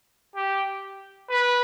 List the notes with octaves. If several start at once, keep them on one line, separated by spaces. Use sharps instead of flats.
G4
B4